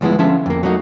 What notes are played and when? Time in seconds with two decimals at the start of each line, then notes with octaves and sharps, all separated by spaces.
0.01 D2 F3 G#3 B3 E4
0.19 D3 F3 C#4 F4 E5 A5
0.46 F2 A#3
0.63 F#3 A3 A#3 D#4 F#4